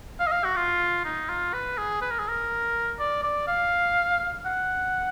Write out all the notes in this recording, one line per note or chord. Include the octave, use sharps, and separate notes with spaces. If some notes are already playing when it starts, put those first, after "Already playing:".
F5
D#5
F5
F#4
F4
D#4
F4
B4
G#4
B4
A#4
G#4
A#4
D5
D5
F5
F#5